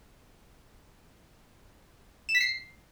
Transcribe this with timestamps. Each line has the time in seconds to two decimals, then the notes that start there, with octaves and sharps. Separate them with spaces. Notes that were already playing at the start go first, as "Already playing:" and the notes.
2.29 E7
2.35 B6
2.41 C7